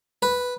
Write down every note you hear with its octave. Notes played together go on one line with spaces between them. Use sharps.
B4